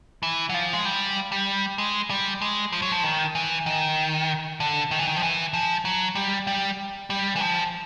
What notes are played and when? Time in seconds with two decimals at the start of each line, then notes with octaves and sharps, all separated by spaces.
0.23 E3
0.49 F#3
0.54 F3
0.73 G#3
0.85 G3
1.32 G3
1.78 G#3
2.10 G3
2.41 G#3
2.72 F3
2.82 F#3
2.92 F3
3.03 D#3
3.35 E3
3.66 D#3
4.60 D3
4.91 D#3
4.99 E3
5.07 D#3
5.16 F3
5.23 E3
5.53 F3
5.85 F#3
6.15 G3
6.47 G3
7.10 G3
7.36 E3
7.41 F3